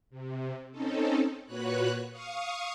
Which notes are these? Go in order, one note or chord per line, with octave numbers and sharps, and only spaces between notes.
C3
C4 C#4 D#4 A4
A#2 F#4 B4 C#5 F#6
F5 C#6 D#6